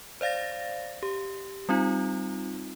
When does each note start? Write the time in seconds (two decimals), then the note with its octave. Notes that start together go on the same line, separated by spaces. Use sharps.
0.21 C5 D5 F5 A6 A#6
1.03 G4
1.69 G3 C4 D#4 F4